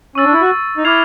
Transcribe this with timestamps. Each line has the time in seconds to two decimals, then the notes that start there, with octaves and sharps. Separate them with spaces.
0.15 C#4 C#6 E6 A6
0.24 D4
0.33 E4
0.42 F#4
0.78 D#4
0.84 E4 D6 F6 G#6 C7 F7